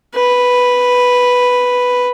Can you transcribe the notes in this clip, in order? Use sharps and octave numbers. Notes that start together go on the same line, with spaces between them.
B4